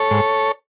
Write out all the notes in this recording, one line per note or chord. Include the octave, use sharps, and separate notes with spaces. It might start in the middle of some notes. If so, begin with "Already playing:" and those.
Already playing: A4 C#5
G#2